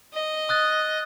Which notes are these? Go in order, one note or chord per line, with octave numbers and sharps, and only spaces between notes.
D#5
D#6 F#6 A6